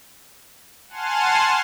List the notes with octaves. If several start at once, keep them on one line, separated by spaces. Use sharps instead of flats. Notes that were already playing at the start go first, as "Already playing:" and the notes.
F#5 G#5 A5 C6 F6